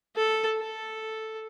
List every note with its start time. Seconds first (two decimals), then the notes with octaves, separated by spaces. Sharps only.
0.16 A4
0.58 A4